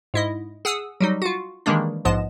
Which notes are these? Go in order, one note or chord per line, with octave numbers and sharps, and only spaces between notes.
G#2 E4 D#5
G#4 F#5 D#6 E6
F#3 G3 D#4
F4 F#4
D#3 E3 G3 G#3 A#3 D4
A#1 G#2 F3 B3 D#5 E7